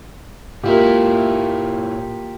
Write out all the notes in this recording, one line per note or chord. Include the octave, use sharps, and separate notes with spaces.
A#2 A#3 E4 F4 G4 E5